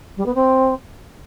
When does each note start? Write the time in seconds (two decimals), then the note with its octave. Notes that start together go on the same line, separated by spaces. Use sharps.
0.17 G3
0.26 B3
0.35 C4